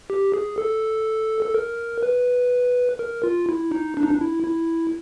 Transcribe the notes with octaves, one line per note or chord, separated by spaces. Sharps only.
G4
G#4
A4
A4
A#4
B4
A#4
F4
E4
D#4
D4
D#4
D4
E4
E4